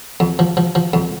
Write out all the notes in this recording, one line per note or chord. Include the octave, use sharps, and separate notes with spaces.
F2
F3
F3
F3
F2